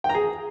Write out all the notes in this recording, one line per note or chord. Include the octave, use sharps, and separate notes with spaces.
G5
A#5
G#4